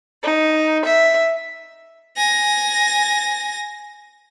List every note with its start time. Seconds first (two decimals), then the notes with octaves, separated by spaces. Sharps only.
0.22 D#4
0.85 E5
2.17 G#5 A#6